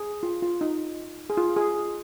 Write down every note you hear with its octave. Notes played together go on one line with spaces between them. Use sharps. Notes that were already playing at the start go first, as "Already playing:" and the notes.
Already playing: G#4
F4
F4
D#4
G#4
F4
G#4